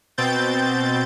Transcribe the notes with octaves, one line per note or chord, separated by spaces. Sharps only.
B2 C4 G6 A6